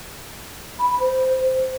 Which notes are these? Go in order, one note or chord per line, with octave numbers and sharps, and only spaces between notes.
B5
B5
C5